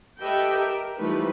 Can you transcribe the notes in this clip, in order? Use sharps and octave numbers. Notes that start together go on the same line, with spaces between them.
G4 A4 B4 D#5 E5 G5
A#4
E3 F3 G3 A3 D#4 B4